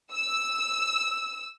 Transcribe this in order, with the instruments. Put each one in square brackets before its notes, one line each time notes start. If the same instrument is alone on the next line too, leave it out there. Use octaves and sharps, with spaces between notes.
[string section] E6